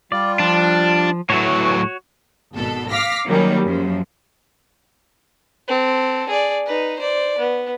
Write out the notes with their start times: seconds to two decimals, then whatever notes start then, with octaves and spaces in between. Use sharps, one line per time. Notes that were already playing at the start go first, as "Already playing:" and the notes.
0.12 G3 F4 D5
0.39 F3 D4
1.30 A2 E3 F#3 F#4 C#5
2.53 G#1 B2 A4
2.90 F5 D6 F6 A#6 B6
3.27 D#3 F#3 G3 A#3 C#4
3.65 F#2 F3
5.68 C4 A4
6.29 G#4 D5
6.66 D#4 B4
6.99 C5 D5
7.38 B3